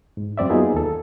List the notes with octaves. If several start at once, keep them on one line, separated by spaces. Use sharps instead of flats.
G#2
F#2 C4 D5 E5
F#3 A#3 B3 D#4 F4 G#4
D#2 A4